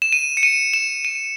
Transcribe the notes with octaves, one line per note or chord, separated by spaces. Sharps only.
E7
D#7
C#7
D#7
E7
D#7